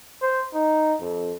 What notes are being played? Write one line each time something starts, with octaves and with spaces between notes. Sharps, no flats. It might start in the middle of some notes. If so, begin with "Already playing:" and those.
C5
D#4
F2